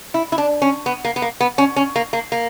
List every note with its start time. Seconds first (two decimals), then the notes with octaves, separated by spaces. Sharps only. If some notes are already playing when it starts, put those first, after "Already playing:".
0.14 E4
0.32 E4
0.38 D4
0.62 C#4
0.86 B3
1.05 A#3
1.16 B3
1.22 A#3
1.41 B3
1.58 C#4
1.76 C#4
1.96 A#3
2.13 A#3
2.32 A#3